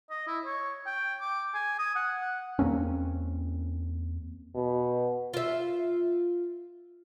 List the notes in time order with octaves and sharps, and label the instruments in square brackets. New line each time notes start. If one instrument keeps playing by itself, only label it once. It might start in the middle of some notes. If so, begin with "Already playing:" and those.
[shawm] D#5
E4
C#5
G5
D6
G#5
D#6
F#5
F#5
[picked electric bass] E2 A#3 C4 C#4
[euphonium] B2
[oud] F4 E5